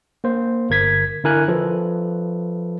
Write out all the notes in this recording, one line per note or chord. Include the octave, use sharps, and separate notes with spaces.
A#3 C5
G1 A#4 G#6 B6
D3 E4 A#4 G#5 F#6
F3 A4 B4